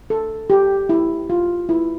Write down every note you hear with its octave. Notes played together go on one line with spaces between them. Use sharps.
A4
G4
E4
F4
E4